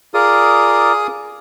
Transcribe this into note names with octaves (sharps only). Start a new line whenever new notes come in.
F4 G#4 A#4 D5 D#6